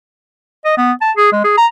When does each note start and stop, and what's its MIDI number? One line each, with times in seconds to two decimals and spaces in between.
0.65 0.74 75
0.77 0.92 59
1.01 1.11 81
1.17 1.31 68
1.32 1.44 56
1.44 1.57 68
1.57 1.66 82